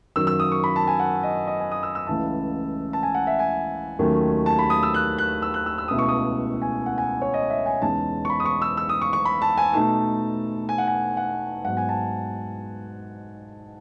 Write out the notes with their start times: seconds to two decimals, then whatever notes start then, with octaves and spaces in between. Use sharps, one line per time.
0.16 F#2 D#3 F#3 E6
0.27 E6
0.40 D#6
0.52 C#6
0.64 B5
0.76 A5
0.87 G#5
1.00 F#5
1.23 D#5
1.47 D#5
1.60 G#5
1.71 D#6
1.83 E6
1.95 E6
2.07 C#2 C#3 E3 A3 E4 A5
2.93 A5
3.03 G#5
3.15 F#5
3.27 E5
3.39 G#5
3.99 D#2 D#3 F#3 A3 C#4
4.46 A5
4.59 B5
4.70 D#6
4.83 E6
4.94 F#6
5.18 F#6
5.42 E6
5.54 F#6
5.66 E6
5.78 E6
5.88 C#2 B2 A3 E4 D#6
5.99 C#6
6.09 D#6
6.62 G#5
6.86 F#5
6.98 G#5
7.22 C#5
7.34 D#5
7.50 E5
7.66 G#5
7.82 E2 C#3 G#3 D#4 A5
8.25 C#6
8.30 B5
8.40 D#6
8.45 C#6
8.62 E6
8.77 E6
8.89 D#6
9.02 C#6
9.13 C#6
9.25 B5
9.42 A5
9.58 G#5
9.73 B2 A3 D#4 A5
10.69 G#5
10.78 F#5
10.88 G#5
11.17 F#5
11.65 G#2 F#3 B3 F#5
11.77 G#5
11.89 A5